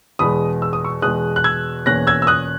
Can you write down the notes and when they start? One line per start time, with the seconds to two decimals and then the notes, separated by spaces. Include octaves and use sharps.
0.19 E2 B2 G#3 B5 D#6
0.62 E6
0.73 D#6
0.84 C#6 E6
1.02 E2 B2 G#3 D#6 F#6
1.36 F#6
1.44 E6 G#6
1.86 E2 B2 A#3 C#4 F#6 A#6
2.07 E6 G#6
2.22 E6
2.27 D#6 F#6